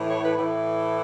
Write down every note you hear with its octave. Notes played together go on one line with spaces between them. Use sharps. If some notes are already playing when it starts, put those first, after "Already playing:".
Already playing: A2 E3
C#5
B4
A2 E3